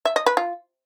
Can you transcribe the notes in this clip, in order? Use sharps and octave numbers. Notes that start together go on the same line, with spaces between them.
E5
D#5
B4
F4